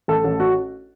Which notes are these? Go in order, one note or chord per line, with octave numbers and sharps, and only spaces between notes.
A1 A4
A1
F#4